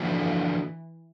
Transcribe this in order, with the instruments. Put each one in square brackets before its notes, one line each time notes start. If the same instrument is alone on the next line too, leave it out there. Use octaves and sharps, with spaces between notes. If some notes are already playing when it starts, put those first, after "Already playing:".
Already playing: [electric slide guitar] D3 F3 A#3 D4 F#4 [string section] E3